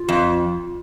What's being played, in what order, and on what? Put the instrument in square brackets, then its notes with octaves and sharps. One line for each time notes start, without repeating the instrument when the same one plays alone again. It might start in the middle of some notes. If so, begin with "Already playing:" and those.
Already playing: [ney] F4
[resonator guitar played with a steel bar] F2